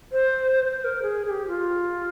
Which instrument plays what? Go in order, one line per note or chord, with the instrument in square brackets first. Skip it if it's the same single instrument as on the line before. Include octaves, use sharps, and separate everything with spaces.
[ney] C5
C5
C5
A#4
G#4
G#4
G4
F4